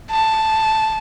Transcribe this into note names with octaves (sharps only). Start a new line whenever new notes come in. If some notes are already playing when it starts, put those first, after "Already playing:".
A5